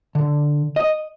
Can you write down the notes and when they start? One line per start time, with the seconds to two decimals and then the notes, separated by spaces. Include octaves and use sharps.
0.15 D3
0.76 D#5